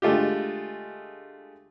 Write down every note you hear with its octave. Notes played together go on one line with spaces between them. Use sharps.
D3 G#3 A3 F4 G4